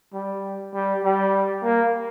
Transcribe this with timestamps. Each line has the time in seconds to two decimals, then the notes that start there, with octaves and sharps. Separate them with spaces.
0.14 G3
0.75 G3
1.04 G3
1.64 A#3